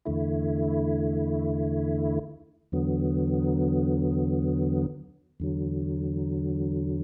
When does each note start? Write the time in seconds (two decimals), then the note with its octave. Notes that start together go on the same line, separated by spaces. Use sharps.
0.05 E2 D3 A3 E4
2.72 E2 D3 F#3 B3
5.40 E2 D3 F#3